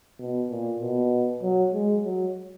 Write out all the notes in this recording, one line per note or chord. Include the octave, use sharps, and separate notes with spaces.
B2
A#2
B2
F#3
G#3
F#3